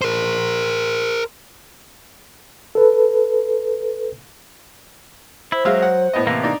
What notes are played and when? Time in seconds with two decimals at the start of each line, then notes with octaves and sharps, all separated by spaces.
0.02 A#4 C5
2.75 A4 B4
5.52 E4 C5
5.65 F#3 G#3 E5 F5
5.82 F#5
6.13 A2 B3 D#5
6.27 C3 E3 A#3
6.43 D4 D#4